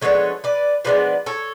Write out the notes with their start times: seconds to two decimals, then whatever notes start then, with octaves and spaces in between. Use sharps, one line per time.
0.01 F3 G#3 B3 D4 A4 C#5
0.44 B4 D5
0.85 F3 G#3 B3 D4 B4 D5
1.26 A4 C#5